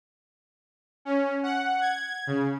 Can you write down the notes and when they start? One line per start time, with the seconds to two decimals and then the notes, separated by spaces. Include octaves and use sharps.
1.05 C#4
1.43 F#5
1.81 G#6
2.27 C#3